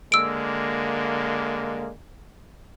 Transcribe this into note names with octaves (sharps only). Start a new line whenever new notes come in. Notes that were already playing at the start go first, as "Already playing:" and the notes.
D3 G#3 A#3 E6 D7